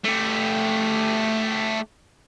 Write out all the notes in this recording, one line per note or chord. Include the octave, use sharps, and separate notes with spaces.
A3 G4